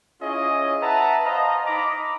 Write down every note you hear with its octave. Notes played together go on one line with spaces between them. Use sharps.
C#4 E4 F4 G#4 C#5 D#5
B4 E5 F#5 A5 A#5
C5 D#5 F5 A5 A#5
D#4 A#5 B5 D6